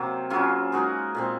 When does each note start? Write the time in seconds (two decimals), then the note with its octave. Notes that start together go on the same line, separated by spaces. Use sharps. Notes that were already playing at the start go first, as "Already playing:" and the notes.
Already playing: C3 F#3 A#3 C4
0.30 C#3 F#3 C#4 F4
0.72 G#3 D#4 F#4 A#4
1.15 A#2 G#3 C4